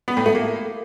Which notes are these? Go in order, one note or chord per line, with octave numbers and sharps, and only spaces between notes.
B3
A2
A3
A#3